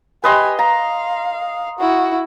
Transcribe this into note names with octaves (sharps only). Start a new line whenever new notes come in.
G4 B4 D#5 G#5 C6
F5 A#5
E4 F#4